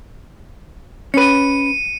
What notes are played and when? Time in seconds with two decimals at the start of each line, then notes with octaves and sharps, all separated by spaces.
1.14 C#4 B4 C#7 D#7